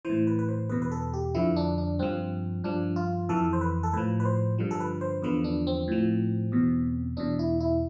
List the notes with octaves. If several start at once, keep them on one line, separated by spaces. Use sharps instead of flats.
A2 E3 C5
B4
B4
C5
E2 B2 B4
B4
A4
G4
F2 D3 F3 E4
D4
D4
G2 F3 C4
G2 F3 D4
F4
F2 E3 A4
C5
B4
A4
A2 F3 B4
B4
C5
G2 D3 F3
A4
B4
C5
E2 D3 F3 B4
D4
C4
A2 F3
E2 B2
E2 B2 D4
E4
E4